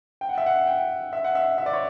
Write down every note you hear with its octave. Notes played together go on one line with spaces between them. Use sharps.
G5
F#5
E5
F#5
G5
E5
F#5
E5
E5
D5
C#5